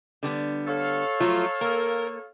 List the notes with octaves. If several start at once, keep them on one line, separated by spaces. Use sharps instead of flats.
D3 G3 B3
A4 C#5 F5
F3 F#3 A3 F4
A#3 A#4